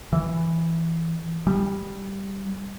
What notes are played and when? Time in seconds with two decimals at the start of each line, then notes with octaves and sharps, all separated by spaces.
0.13 E3
1.47 G3